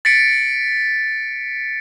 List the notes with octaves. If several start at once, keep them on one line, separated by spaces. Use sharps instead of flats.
A6 B6 C#7 D7